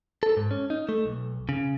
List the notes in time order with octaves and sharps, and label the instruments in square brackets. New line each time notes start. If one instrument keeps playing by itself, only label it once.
[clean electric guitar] A4
G#2
C#4
D#4
A3
B1
C#3